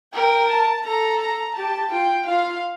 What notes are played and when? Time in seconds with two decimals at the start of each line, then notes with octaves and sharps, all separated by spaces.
0.14 A#4 G5
0.50 A5
0.85 A4 A#5
1.20 A#5
1.56 G4 A5
1.91 F4 G5
2.27 F4 F5